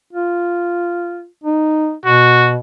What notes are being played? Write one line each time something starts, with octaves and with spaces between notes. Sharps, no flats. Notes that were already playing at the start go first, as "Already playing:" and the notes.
F4
D#4
B2 F#4